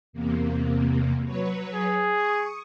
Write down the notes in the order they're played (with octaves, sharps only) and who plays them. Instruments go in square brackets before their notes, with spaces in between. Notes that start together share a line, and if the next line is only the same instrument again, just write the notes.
[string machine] E2 C3 A#3
F#3 B4 C#5
[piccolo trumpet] G#4
[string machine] C#6 D#6